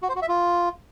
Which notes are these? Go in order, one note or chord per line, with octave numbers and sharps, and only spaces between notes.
F#4
C5
F#4
E5
F4